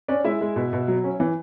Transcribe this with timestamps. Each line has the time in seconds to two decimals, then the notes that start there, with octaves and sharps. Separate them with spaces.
0.08 C#4 D4 D5
0.24 G#3 E4 E5
0.41 G#3
0.56 B2
0.73 B2
0.88 F#3
1.04 C#4
1.20 E3